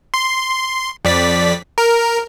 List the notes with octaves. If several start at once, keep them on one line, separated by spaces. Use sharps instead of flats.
C6
F2 D5 B6
A#4